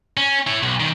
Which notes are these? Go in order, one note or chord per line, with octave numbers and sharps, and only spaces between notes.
C#4
E4 C#5
B1
B1 D#3